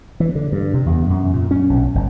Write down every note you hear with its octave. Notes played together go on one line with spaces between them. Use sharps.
E3
D3
G2
C3
E2
F#2
A#2
C#4
B1
G1